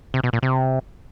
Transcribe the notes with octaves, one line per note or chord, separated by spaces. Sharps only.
C3
B2
A#2
C3